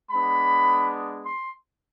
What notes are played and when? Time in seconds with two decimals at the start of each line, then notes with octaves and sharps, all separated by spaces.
0.11 G#3 B3 D4 B5
1.25 C6